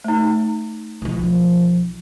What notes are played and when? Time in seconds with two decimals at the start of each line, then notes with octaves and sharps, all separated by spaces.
0.04 A3 D#4
1.02 B1 F3